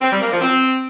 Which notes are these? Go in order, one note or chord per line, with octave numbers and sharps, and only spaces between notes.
C4
G3
A#3
F3
C4